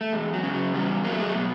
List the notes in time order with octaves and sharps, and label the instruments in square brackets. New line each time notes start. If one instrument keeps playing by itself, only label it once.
[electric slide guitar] A3
E2 G#3
F#3
C#3
F#3
E2 G3
F#3 A#3
A3
G#3
A3
B2